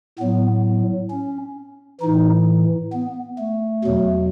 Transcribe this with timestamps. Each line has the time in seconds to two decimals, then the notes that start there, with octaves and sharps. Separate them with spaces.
0.19 A2 F#3 B3
1.10 C#4
2.01 A2 E3 D#4
2.93 B3
3.39 A3
3.84 E2 B2 F#3